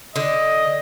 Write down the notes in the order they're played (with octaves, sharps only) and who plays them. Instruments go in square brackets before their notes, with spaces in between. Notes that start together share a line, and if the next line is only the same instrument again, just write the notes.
[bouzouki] D3 [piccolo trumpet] D#5